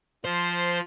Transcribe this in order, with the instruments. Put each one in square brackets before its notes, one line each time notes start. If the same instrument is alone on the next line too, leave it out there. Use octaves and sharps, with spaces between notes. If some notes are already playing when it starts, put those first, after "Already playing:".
[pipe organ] F3 [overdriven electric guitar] C5